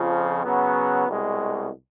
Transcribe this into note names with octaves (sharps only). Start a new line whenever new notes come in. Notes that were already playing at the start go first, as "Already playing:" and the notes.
Already playing: F2 C#3 F3
C#3 F#3 B3
C2 B2 G#3